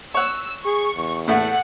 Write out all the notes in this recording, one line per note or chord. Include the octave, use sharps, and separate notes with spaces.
C#5 F#5 E6
G#4 C#6
E2
A2 A3 F#5